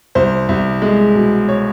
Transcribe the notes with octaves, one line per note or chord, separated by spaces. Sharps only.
C2 C5
C2
G#3
B2
C#5